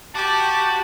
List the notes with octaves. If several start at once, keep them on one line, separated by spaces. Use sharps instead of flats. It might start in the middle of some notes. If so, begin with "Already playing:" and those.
F#4 G4 A5 D6